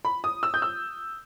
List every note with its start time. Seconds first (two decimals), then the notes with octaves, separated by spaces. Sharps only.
0.05 B5
0.24 D#6
0.43 E6
0.54 G6
0.62 E6